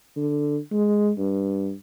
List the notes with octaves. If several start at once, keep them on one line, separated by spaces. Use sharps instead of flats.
D3
G#3
G2